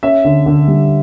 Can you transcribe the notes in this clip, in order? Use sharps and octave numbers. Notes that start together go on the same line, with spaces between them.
C#4 E5
D3
D3
G3